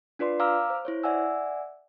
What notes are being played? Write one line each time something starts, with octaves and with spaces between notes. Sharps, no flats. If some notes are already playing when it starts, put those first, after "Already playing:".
D4 F4 B4 D5 C6
F5 A#5 D6 E6 F6
C5
E4 C5 C#5
D5 E5 F#5 G#5 E6